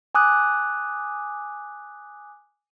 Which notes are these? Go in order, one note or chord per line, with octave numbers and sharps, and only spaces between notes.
G#5 D6 D#6 F#6